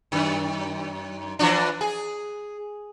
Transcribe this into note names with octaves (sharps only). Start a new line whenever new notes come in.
F#2 D#3
E3 F3 D4
G#4